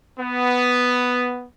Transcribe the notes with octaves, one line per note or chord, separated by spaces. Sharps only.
B3